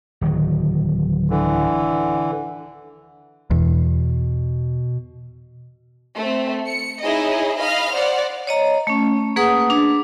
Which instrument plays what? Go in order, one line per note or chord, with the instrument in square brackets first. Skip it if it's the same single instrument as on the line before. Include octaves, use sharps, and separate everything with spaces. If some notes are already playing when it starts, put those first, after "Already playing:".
[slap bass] D1 D#3 F#3
[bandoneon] D3 E3
[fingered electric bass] E2 [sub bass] B2
[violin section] A3 C4
C#7
D#4 E4 G#4 C#5 D#5
D#5 F5 B5 F6
C5 D5 F#5
[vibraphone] C#5 D#5 A#5
A3 C#4
A#3 G#4 B4 F#5 D#6
D4